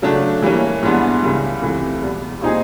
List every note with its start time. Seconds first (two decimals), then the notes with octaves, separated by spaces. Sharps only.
0.02 C#3 F#3 A3 D4
0.42 E3 G3 A#3 C#4
0.83 G#2 E3 G3 B3 D4
1.23 C#2 C#3 E3 G3
1.61 C#2 C3 E3 A3
2.02 E2 B2 G3
2.41 A#2 G3 C4 D#4 G#4